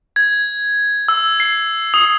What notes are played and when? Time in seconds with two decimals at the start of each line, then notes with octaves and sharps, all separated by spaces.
0.16 G#6
1.08 E6
1.40 C7
1.94 D#6